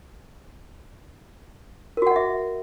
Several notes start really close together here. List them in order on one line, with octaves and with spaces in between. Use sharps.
A#4 F#4 F#5 D#5 E5